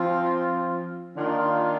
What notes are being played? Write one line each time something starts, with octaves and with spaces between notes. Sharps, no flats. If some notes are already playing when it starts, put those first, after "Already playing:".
Already playing: F3 C4 F4
D#3 A#3 D4 F4